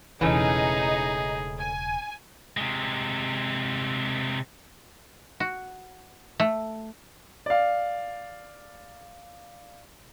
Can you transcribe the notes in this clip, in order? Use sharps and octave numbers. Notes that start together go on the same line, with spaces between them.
E1 C#3 E3 A3 C#4 D#4 G#4
G#5
C3 G#3
F#4
A3
D5 F5